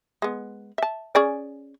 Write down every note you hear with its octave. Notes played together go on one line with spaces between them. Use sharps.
G#3 B3
E5 A5
C#4 G#4 D5